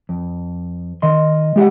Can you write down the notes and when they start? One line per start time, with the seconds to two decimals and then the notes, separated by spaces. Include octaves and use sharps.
0.09 F2
1.02 D#3 D#5 C6
1.56 G#3 G4 E5 F#5